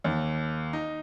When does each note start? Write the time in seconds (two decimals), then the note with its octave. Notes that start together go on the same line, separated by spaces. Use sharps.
0.04 D#2
0.73 D#4